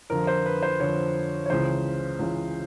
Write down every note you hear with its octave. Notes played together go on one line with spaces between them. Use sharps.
F2 D3 F3 A#4
C5
B4
C5
F2 D3 F3 C#5
C#5
C#2 C#3 E3 C5
C#2 C#3 E3